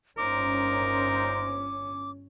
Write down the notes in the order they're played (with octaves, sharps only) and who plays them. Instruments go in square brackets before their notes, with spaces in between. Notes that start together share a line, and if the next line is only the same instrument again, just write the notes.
[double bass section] G1 C#4 [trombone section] A#2 D#4 C5 [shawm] A#4 [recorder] D6